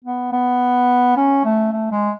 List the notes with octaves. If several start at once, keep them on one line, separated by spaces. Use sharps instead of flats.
B3
B3
C#4
A3
A3
G#3